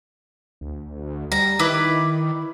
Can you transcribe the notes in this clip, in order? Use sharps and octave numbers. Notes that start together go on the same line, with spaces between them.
D2
G3 A#5
D#3 E4 B4 D5